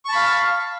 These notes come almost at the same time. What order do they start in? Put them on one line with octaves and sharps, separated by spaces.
C#6 A5 B5 F5